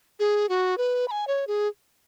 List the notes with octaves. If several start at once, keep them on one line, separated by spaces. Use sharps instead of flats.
G#4
F#4
B4
B5
G#5
C#5
G#4